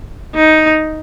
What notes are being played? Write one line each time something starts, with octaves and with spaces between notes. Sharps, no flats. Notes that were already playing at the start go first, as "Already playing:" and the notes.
D#4